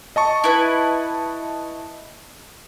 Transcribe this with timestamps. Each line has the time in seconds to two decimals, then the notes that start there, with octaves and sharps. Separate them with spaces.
0.16 D#5 A5 C#6
0.44 E4 B4